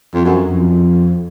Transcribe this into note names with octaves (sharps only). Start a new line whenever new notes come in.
F2
F#2
F2